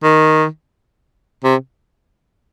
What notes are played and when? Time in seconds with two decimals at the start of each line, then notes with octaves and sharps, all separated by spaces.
0.03 D#3
1.44 C3